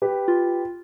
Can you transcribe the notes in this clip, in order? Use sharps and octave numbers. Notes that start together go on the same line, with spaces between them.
G4 B4
F4